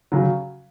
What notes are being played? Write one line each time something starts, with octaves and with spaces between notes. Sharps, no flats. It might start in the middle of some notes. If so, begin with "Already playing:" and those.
C#3 F#3